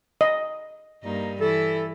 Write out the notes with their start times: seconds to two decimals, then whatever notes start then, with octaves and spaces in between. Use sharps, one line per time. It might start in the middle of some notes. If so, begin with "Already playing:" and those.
0.21 D#5
1.03 G2 A#3 D#4
1.41 E3 E4 A4